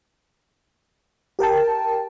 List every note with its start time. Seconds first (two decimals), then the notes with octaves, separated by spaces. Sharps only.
1.39 G4 A#4 G5 A5